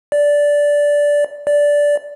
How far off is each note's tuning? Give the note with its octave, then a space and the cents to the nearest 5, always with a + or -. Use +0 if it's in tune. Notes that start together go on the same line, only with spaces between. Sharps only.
D5 -10
D5 -10